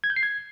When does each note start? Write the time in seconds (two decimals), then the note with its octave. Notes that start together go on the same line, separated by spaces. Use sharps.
0.04 G#6
0.10 G6
0.16 C7
0.23 G#6